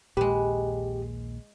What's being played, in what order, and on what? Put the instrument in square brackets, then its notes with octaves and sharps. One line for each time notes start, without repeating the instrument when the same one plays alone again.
[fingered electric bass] A#1 D#2 A#2 [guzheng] G#3 B4 [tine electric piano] G4